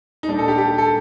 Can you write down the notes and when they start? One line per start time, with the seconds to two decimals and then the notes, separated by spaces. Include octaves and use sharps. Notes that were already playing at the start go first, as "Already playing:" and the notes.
0.23 D#4
0.28 A#2 G3 D4
0.39 A4
0.48 G4
0.58 G4
0.78 A4